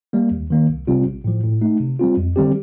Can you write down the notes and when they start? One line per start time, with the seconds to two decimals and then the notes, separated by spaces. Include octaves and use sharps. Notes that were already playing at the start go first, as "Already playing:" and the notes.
0.13 G3 A#3
0.31 D#2
0.50 D#3 A#3
0.69 C2
0.87 C3 G3 C4 F4
1.05 A#1
1.24 A2 F3
1.43 A2
1.61 A3 D#4
1.80 C3
2.00 G3 C4 F4
2.17 F2
2.36 D3 G3 C4 G4